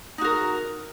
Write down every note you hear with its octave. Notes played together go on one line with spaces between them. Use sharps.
D#4 F#4 A#4